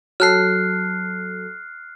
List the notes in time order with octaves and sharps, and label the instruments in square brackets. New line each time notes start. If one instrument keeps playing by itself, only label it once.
[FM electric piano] F#3 A4 [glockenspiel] F6 F#6 C7